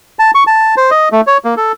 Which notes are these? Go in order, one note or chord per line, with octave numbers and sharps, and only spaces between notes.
A5
C#6
A5
C5
D#5
A3
C#5
A#3
A4